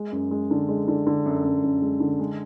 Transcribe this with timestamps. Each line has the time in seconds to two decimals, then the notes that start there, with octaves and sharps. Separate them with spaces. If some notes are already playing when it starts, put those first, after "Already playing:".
Already playing: G#3
0.12 F#2
0.31 G#3
0.51 D3
0.69 G#3
0.88 D3
1.07 D3
1.26 F#2
1.44 F#2
1.64 F#2
1.82 G#3
2.00 D3
2.20 G#3